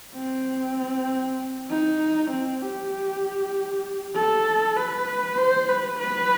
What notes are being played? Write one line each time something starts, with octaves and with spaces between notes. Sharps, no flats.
C4
D#4
C4
G4
A4
B4
C5
B4
B4